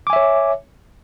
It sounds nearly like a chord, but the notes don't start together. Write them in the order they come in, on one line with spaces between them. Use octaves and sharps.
D6 G#5 E5 C#5